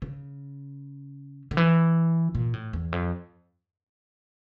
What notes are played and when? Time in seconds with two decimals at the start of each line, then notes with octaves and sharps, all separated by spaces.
0.02 C#3
1.51 D3
1.57 E3
2.35 A#2
2.53 A2
2.73 E2
2.92 F2